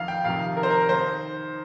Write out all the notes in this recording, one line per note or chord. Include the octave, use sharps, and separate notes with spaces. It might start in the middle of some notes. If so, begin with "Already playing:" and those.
Already playing: F2 D#3 F5
G5
F2 C3 D#3 F5
A#4
C5
A#4
D#3 C5